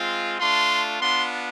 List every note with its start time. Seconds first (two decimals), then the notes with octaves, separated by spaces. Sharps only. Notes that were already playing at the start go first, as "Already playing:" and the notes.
Already playing: G#3 C4 F4
0.39 A3 D4 F4 C6
1.00 B3 D4 F4 C6